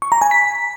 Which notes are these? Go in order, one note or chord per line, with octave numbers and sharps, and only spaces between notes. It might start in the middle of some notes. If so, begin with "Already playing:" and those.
C#6
A#5
G#5
B6